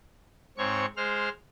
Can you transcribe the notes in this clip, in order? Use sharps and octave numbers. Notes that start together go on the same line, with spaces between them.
G#2 C4 C#5 C#6
G#3 C5 F6